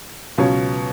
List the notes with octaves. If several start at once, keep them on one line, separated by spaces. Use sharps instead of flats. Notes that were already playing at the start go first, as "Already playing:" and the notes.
C#2 B2 F#3 C#4